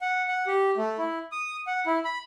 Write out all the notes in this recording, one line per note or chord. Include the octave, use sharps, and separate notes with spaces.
F#5
F#5
G4
A3
E4
D#6
F#5
E4
B5